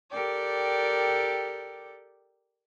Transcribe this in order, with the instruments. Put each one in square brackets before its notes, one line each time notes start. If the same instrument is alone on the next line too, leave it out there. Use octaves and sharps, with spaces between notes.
[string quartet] G4 A4 A#4 D5 G5